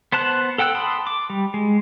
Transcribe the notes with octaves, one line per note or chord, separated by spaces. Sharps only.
B3 C5 A5 F#6
A4 F#5 G5 E6 F#6
A5 B5 C6 D#6
D6
G3
G#3